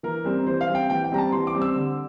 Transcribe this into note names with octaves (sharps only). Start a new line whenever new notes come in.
E3 A#4
G3 C4
E3 C5
F5
G3 C4
G5
E3 G5
G5
G3 C4 A#5
A5
E3 C6
D6
G3 C4
E6
D3